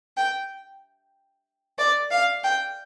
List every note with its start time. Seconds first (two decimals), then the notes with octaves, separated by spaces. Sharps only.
0.17 G5
1.79 D5
2.11 F5
2.44 G5